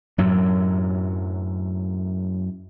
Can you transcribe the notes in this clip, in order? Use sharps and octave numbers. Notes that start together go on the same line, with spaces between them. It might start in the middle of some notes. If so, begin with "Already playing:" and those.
F#2 A2 F#3